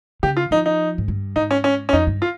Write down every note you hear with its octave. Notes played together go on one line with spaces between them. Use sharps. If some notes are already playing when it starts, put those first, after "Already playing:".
C#3 G4
F4
F3 D#4
D#4
G#2
G2
G#2 D#4
C#4
C#4
C#4
F2 D#4
G2
F4